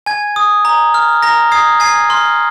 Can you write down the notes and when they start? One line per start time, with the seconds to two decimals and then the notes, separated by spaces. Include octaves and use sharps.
0.06 G#5 G#6
0.36 D#6
0.65 A#5
0.94 F6
1.22 A#5 A#6
1.52 D#6 G#6 C7
1.80 G#5 G#6 C7
2.10 C6 F6